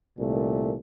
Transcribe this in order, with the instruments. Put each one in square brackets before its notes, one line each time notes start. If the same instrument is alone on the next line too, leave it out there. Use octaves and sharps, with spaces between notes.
[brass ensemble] C2 A#2 D#3 A3